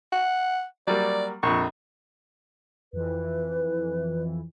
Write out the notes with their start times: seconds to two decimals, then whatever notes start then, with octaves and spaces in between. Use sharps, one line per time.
0.12 F#5
0.87 F#3 G3 A#3 D5
1.43 A#1 F2 C#6
2.93 F2 E3 B4